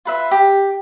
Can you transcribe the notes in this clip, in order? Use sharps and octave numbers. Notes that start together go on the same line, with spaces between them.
F4 B4 E5
G4